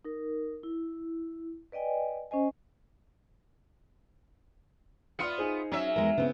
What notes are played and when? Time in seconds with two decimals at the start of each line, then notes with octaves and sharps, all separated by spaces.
0.05 D#4 A#4
0.63 E4
1.72 B4 D5 D#5 G5 G#5
2.31 C#4 C5 D#5 G#5
5.19 B3 F4 D5 F6 C#7
5.38 D#4 G#4 C5
5.72 F#3 C#4 E5
5.96 E2 G#3 A#4
6.18 C#3 B3 C4 E4